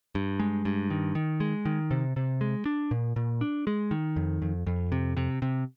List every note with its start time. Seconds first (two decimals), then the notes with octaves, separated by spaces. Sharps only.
0.15 G2
0.40 G#3
0.65 G2
0.90 D#3
1.15 D#3
1.40 G#3
1.65 D#3
1.91 C3
2.16 C3
2.41 G#3
2.66 D4
2.91 A#2
3.16 A#2
3.41 D4
3.67 G#3
3.91 D#3
4.16 F2
4.42 F2
4.67 F2
4.92 C3
5.17 C3
5.42 C3